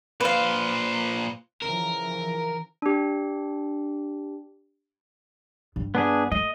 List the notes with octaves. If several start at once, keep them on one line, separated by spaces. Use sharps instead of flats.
A#2 B4 C5 F5
C#3 E3 F3 A#4
D4 G4
G2 G3
B3 D4 G#4
A3 D#5